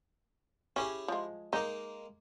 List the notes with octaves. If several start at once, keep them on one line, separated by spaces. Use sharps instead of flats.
C#4 E4 G4 G#4
F3 G#3
G#3 A#3 D#4